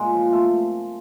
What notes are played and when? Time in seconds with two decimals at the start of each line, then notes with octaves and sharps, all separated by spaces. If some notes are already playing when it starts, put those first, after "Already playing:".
Already playing: A#2 C#3 G#3
0.14 F3
0.33 C3 A3